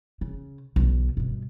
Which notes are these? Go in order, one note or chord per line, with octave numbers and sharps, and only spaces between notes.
C#3
B1 D3
G2 B2